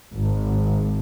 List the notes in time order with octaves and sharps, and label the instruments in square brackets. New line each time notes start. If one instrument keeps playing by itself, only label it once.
[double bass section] G#1